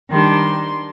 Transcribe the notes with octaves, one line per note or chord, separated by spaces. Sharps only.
D#3 G3 D4 C6